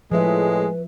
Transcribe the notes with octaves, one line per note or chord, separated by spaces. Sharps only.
A2 F3 G#3 B4 E5